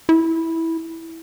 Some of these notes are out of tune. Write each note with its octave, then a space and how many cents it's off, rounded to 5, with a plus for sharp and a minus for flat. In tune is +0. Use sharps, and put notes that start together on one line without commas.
E4 -10